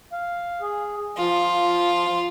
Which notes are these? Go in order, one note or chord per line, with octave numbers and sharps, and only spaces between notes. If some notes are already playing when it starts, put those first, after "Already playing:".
F5
G#4
F3 F4